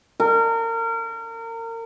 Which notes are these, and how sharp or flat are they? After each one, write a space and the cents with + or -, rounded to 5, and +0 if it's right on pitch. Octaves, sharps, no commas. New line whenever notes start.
A#4 -30